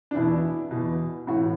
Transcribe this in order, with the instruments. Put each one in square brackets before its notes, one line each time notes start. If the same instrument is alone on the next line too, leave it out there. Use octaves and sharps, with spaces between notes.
[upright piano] D4
E2 B2 E4
E2 B2
A2 E3 F#4